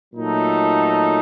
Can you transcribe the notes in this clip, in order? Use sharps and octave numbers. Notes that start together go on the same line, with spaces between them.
A#2 F#3 A3 D#4 A4